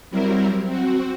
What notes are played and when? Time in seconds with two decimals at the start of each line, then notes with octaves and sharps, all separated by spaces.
0.10 F#3 G3 C4 E4 A#4
0.65 C4 F#4